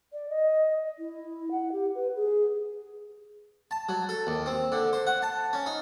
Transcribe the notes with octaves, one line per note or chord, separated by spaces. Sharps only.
D5
D#5
E4
F#5
G4
B4
G#4
A5
F#3
A4
D#2
C4
D3
C5
F#5
A5
C#4
D#4